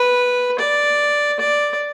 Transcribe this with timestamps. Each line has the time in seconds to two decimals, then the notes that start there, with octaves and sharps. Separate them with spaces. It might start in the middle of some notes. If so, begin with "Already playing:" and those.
Already playing: B4
0.58 D5
1.39 D5